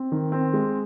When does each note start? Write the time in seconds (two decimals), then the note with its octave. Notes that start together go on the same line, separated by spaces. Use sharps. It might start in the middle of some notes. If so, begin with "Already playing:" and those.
Already playing: C4
0.12 D#3
0.32 C4
0.54 G#3